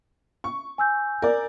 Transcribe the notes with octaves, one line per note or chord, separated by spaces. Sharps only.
C#6
G#5 E6 G6
A#4 D5